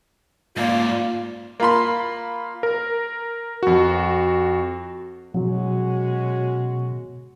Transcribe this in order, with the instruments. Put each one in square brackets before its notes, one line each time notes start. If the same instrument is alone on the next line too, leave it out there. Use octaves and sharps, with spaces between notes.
[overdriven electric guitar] G#2 D5 [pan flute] A#3 [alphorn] F4
[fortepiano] A#3 F4 B5 C6
[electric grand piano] A#4
F2 F#4
[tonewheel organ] B2 [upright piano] F#3 [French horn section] G#3 C#4 F#4